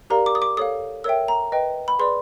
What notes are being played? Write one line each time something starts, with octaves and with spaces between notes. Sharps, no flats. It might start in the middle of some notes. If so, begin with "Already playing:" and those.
G4 A#4 D5 F5 A#5
D6
D#6
D6
A4 C#5 F5 D#6
A#4 C#5 E5 G5 E6
A#5
B4 D#5 G5
B5
G#4 B4 D5 C6